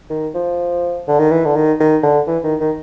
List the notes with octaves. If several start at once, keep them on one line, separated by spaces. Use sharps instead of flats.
D#3
F3
D3
D#3
E3
D3
D#3
D#3
D3
E3
D#3
D#3